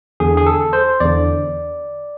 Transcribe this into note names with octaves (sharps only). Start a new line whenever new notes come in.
E2 D3 G#4
G#4
A4
C5
E2 D3 D5